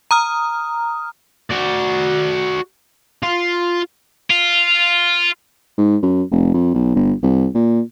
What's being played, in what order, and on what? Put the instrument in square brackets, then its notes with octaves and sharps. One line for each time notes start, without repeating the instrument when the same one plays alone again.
[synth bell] A#5 D#6 F6
[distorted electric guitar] F#4 D5
F4
F4
[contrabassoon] G#2
F#2
F1
F2
B1
G1
C2
A#2